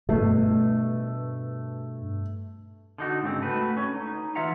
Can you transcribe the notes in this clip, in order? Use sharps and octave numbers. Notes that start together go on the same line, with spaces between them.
G2 B2 A3
D3 D#4 F#4
G#2 C#3 C4
A3 F#4 B4
C#4
D#4
E3 F4 E5 F#5 A#5